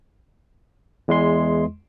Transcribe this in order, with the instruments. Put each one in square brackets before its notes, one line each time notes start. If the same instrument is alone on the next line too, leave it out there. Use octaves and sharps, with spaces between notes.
[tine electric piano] E2 G#3 C6